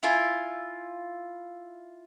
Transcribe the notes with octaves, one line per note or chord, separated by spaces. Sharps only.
E4 F4 G#5